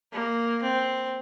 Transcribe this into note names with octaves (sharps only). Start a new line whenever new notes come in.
A#3
C4